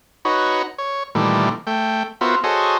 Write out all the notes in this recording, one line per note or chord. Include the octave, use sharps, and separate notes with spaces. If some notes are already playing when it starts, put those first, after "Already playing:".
D#4 F#4 B4 C#5
C#5
A#2 D#3 E3 G3 A3
A3 G5
B3 F4 F#4 A#4 C5 E5
F#4 G#4 A4 C5 C#5 D#5